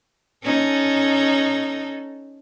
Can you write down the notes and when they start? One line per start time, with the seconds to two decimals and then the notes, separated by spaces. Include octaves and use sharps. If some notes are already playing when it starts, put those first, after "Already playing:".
0.44 C#4 D#4 A4